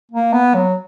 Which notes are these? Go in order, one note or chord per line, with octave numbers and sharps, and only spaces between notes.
A#3
B3
F#3